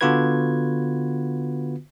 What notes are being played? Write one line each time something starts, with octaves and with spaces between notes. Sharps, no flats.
D3 B3 F4 F#4 B4 G#6